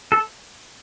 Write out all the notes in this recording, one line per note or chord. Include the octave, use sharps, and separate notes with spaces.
A4